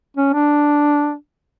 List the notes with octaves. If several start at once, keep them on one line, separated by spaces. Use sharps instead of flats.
C#4
D4